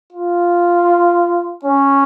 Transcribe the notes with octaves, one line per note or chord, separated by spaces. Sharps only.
F4
C#4